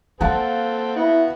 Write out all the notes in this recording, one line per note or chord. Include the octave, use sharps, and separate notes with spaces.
A#3 C4 A4 F5 F#5 A5
B3 E4 F#4